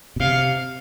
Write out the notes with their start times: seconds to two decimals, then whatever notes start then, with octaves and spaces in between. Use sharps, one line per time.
0.16 B2
0.20 C3 F5